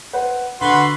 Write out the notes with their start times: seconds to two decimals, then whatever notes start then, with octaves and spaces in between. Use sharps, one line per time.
0.13 B4 C5 F#5
0.61 D3 F#4 B4 C6 G7